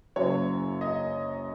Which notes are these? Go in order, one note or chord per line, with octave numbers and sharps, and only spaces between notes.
F#1 F#2 C#3 F#3 C#5
D#5